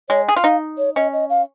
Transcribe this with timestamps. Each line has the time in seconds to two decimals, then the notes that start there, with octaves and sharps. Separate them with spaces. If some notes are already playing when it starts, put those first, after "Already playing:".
0.09 G#3 C#5
0.29 G#4
0.36 F4
0.44 D#4 F5
0.78 C#5
0.96 C#4 D#5
1.13 D#5
1.30 F5